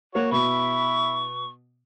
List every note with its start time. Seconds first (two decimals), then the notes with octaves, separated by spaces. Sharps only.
0.15 A#3 F#4 C#5
0.32 B2 E4 B5 C#6